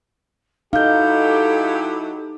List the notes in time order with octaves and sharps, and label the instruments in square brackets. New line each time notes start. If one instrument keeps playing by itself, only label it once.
[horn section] F#3 E4 G4 [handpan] D#4 [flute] A4 [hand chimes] F5 G6